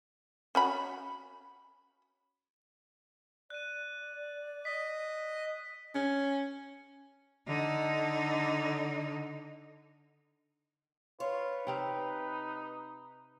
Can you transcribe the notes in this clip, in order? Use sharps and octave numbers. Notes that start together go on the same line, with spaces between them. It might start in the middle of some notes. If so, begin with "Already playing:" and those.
C#4 F#4 B5
D5 F#6 D#7
D#5 B6
C#4
D3 D#4
F4 B4 C#5
C3 C4 D#4 F5